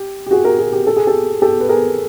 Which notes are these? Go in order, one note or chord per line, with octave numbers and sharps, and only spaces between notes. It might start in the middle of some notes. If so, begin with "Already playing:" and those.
Already playing: G4
G4
F#4 G#4
G#4 A#4
F#4 G#4
G4
A4
G#4
G4 A4
G4 A4
B4
G#4 A#4